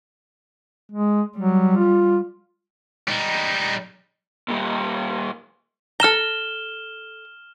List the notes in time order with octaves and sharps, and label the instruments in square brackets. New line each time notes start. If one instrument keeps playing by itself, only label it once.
[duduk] G#3
[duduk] F#3 [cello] G3
[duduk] F4
[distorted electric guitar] G3 D#4
[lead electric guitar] A#2 G3
[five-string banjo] A4 A#5 [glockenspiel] F6 E7 G7